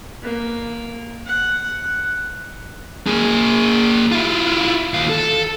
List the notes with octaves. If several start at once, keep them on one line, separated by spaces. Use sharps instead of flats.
A#3
F#5
A#3 G#4
E4 F4
D#2 F5
A4